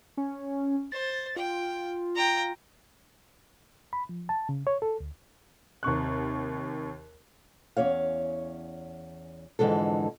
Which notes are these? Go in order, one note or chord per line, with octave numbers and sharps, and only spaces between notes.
C#4
C5 A6
F4 G5
G5 A#5
B5
F3
A5
C#3
C#5
A4
D2
D#2 C3 C#6 F#6
E2 C#4 C#5 F5
F2 G#2 D3 E3 G#3 A4